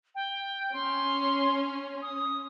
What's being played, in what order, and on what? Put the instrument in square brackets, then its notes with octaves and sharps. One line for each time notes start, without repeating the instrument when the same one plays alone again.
[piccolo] G5
[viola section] C#4 [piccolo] C6
[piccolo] D#6